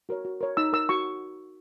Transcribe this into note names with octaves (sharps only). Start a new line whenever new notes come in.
F#4 A#4 C#5
F#4
A#4 C#5
D#4 E6
A#4 C#5 E6
F#4 C#6